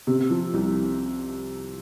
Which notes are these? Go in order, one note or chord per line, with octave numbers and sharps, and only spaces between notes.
C3
F3
C2